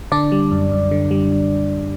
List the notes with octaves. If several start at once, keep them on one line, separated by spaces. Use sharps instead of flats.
D3 D4 D5
G3
F#2
F#2
D3
G3